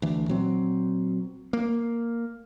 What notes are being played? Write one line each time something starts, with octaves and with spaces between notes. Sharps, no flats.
D2 E3
A#2 F#3 C4
A#3